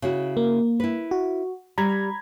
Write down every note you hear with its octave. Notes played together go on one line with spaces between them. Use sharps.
C#3 E4 F#4
A#3
E4 B4
F#4
G3 A#5 B5 G#6